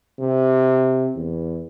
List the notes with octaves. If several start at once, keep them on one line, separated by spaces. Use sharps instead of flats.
C3
E2